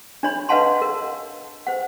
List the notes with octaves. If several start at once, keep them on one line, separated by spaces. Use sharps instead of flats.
D4 C#5 B5
B4 D#5 F5 F#5 A5 C6
A#4
C5 F#5